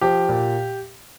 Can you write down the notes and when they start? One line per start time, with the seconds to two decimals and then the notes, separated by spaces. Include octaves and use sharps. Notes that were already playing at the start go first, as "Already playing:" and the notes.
0.01 F3 G4
0.29 A#2